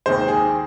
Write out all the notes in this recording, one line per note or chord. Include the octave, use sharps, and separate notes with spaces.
D#2 D#3 G#3 C5
G#4